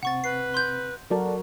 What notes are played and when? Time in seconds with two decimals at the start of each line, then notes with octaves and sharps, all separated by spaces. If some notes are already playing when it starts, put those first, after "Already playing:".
0.03 C3 C4 F#5 C#6 A6
0.24 B4 C7
0.54 C6 G6
1.10 F#3 F#4 A4 A#4 D5 A5